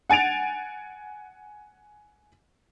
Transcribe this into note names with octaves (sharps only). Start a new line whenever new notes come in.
F#5 G#5 A6 D7 F7